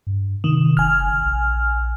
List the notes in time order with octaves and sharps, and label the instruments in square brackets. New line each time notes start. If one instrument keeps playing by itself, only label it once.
[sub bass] G2
[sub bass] C3 [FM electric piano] D#3
[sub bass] F#1 [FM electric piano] G#5 F6
[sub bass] A#1